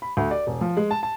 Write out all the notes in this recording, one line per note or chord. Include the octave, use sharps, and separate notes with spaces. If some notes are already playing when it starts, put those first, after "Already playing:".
B5
D2
D5
E1
F3
G#3
A5
A5